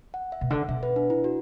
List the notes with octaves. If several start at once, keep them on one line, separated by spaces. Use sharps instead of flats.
F#5
E5
B2
D3 F#5
B2 E5
B4
D4
E4
F#4